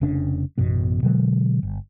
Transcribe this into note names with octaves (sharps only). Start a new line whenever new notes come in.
F1 C#3 D4
A1 F#2 B2 B3
B2 D3 F#3 G#3
G1